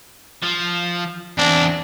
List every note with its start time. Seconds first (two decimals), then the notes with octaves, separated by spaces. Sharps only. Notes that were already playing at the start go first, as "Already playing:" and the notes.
0.43 F3
1.38 E2 C4 D4